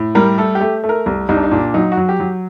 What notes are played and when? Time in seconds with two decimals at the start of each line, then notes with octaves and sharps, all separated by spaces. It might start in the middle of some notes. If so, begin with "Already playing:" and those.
Already playing: A2
0.15 G3 A#4
0.38 A3 A4
0.55 G4
0.61 A3
0.84 A3
0.89 A#4
1.06 C2
1.29 C2 D#4
1.36 D4
1.43 D#4
1.51 A#2 D4
1.74 F#3 D#4
1.92 F#4
1.97 F#3
2.09 G4
2.20 F#3